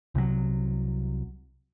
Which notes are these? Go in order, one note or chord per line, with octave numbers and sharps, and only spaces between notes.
C2 C3 D#3 F#3